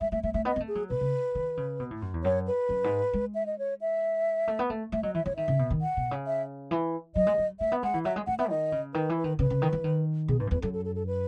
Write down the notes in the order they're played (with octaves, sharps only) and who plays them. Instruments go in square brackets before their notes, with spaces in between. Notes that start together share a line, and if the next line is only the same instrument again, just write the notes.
[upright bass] G#3 [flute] E5
[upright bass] A3 [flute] E5
[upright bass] A3 [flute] E5
[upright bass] A3 [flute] E5
[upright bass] B3 [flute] D#5
[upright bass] B3
A3
[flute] G#4
[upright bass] F#3
[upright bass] B2 [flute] B4
[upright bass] C#3
D#3
C#3
B2
A2
F#2
E2
[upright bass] F#2 [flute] C#5
[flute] B4
[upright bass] F#2
G#2
G#3
[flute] E5
D#5
C#5
E5
[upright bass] A3
B3
A3
[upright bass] A3 [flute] E5
[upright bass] F#3 [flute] D#5
[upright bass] E3 [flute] E5
[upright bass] E3 [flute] C#5
[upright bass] D#3 [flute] E5
[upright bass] C#3
B2
D#3
[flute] F#5
[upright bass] B2
C#3
[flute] E5
[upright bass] E3
[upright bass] F#3 [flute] D#5
[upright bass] G#3
F#3
[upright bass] A3 [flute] E5
[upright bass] B3
[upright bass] G#3 [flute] F#5
[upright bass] E3
[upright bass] F#3 [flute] E5
[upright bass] G#3
[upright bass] A3 [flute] F#5
[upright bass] B3 [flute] E5
[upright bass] D#3 [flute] D#5
[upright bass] C#3
[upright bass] D#3 [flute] B4
[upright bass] E3
[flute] B4
[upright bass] D#3
[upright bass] C#3 [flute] B4
[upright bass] C#3
D#3
E3
D#3
[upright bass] B2 [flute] G#4
[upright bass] G#2 [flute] B4
[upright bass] F#2
[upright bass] E2 [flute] B4
[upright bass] F#2 [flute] A4
[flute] A4
A4
A4
B4